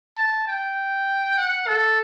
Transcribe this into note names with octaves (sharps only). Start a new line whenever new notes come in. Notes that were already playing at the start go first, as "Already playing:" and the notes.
A5
G5
F#5
A4